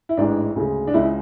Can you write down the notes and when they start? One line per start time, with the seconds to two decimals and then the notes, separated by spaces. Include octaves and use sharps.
0.09 E4
0.17 A1 G#2 E3 G#3 D4
0.56 D2 C#3 G#3
0.87 D4
0.94 C#2 C#3 G#3 E4